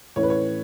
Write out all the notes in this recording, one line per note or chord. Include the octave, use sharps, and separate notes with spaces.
A2 E3 C#4 C#5
B4
C#5